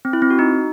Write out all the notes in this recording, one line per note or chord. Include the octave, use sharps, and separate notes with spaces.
C4
E4
C4
F#4
D#4